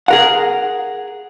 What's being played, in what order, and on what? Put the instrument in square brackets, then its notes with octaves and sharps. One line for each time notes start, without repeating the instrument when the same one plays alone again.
[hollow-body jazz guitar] G#4 A#4 F#5